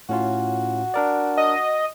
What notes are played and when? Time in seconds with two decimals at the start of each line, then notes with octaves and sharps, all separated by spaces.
0.09 A2 C#4 F4 F#4
0.94 D4 A#4 D5
1.38 D#5